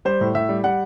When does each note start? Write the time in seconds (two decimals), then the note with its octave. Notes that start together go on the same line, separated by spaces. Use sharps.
0.05 G3 C5
0.21 A2
0.35 A2 E5
0.49 G3
0.64 G3 F#5